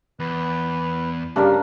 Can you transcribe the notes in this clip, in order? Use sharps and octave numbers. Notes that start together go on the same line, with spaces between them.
E2 B4
G2 C#3 G3 A#3 D4